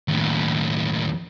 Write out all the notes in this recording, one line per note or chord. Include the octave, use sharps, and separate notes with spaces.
D#2 A2